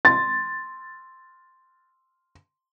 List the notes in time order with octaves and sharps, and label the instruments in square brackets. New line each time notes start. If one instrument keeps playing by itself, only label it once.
[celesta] C6 [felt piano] A6